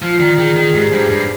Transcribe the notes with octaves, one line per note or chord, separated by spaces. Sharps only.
F3 F4
D#3 D5
D#3 G#4
D#3 G#4
G#2 G4
G2 C5
G2 D5